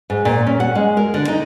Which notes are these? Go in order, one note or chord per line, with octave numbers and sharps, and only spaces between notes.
G#2
A#2
C#4
F#5
G#3
A#4
D3
D#4